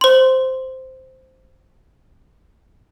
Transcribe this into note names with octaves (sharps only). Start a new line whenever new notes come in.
C5 C6